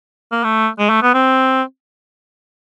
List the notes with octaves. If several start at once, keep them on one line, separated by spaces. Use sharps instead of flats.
A#3
A3
G#3
A3
B3
C4